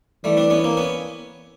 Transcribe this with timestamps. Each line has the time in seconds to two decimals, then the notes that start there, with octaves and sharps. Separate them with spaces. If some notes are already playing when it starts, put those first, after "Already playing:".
0.24 E3 G3 A3
0.37 C4 D4
0.50 B3 C#4
0.64 A#3 C4
0.77 B3 C#4